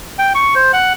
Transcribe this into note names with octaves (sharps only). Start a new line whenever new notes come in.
G5
C#6
C5
F#5